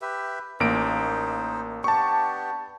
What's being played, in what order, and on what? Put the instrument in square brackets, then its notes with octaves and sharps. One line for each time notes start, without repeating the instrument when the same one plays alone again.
[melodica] G4 B4 E5
[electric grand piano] A1 A#3 D7 [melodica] D#4 C5
[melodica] B3 D4 G4 [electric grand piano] A5 C#6